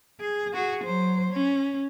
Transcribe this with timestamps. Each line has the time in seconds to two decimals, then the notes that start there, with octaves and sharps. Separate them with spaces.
0.21 G#4
0.53 F#4 G#4
0.84 F#3 C5
1.32 C#4